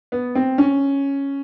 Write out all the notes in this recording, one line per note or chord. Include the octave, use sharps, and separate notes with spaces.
B3
C4
C#4